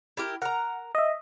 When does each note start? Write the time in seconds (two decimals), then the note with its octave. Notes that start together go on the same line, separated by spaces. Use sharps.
0.17 E4 G4 A#4
0.42 A#4 F#5 A#5
0.95 D#5 E5